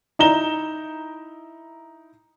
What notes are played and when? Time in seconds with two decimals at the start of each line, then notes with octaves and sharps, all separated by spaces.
0.19 D#4 E4 A#5 E7 G7